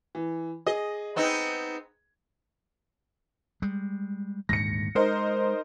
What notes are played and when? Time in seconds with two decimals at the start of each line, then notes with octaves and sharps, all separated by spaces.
0.15 E3
0.66 G#4 D#5
1.16 B3 C4 D#4
3.62 G3 G#3
4.49 D#1 D2 G#2 A#6 C#7
4.95 G#3 D#4 A#4 C5